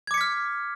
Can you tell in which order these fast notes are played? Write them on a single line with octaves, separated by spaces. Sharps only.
G#6 D6 C#7 B6 F6